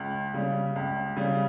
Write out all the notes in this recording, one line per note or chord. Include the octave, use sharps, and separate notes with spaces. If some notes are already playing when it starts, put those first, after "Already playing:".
Already playing: C#2
C#3 G3
C#2
C#3 G3